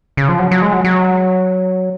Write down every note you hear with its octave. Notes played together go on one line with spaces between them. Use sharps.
C#3
F3
F#3
F#3
G#3
F#3
F#3